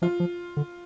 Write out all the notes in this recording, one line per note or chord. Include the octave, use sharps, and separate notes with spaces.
F3 F4
F3
D3